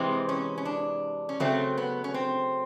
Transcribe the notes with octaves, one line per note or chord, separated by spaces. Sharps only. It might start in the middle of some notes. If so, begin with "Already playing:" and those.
Already playing: C3 E3 G#3 C4
C#4
C#4
D4
C#4
C#3 F#3 A3 C4
B3
C#4
C4